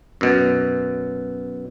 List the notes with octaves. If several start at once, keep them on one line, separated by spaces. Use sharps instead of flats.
F#2 B2